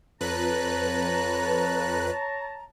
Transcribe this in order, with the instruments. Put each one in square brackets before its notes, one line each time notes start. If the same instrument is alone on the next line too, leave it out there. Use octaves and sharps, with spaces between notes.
[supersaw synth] F2 B4 F#6 [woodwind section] C#5 A5 A#5